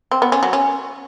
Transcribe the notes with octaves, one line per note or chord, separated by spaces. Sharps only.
C4
B3
C#4
F#3
C#4